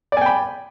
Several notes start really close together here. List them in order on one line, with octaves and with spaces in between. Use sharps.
D5 G#5 G5 B5